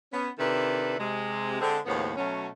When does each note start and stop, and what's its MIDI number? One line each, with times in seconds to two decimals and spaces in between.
0.13 0.29 59
0.13 0.29 61
0.38 0.97 48
0.38 0.97 51
0.38 0.97 62
0.38 0.97 64
0.38 0.97 69
0.38 0.97 71
0.98 1.59 48
0.98 1.59 56
1.60 1.78 50
1.60 1.78 56
1.60 1.78 60
1.86 2.11 39
1.86 2.11 45
1.86 2.11 49
1.86 2.11 53
1.86 2.11 59
2.17 2.47 47
2.17 2.47 54
2.17 2.47 57
2.17 2.47 61